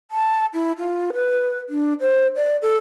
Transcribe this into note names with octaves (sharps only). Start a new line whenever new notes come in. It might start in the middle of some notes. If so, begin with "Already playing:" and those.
A5
E4
F4
B4
D4
C5
D5
A4